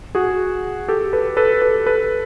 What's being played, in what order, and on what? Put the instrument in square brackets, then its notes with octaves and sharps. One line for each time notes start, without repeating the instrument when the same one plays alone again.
[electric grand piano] F#4 G#4
G4 A4
A4 B4
A4 B4
A4 B4
A4 B4